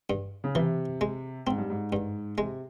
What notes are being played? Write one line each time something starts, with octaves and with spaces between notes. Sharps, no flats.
G2
C#3
C3 E3
G#3
G#2 C4
G2
G#2
G2
C3 G#3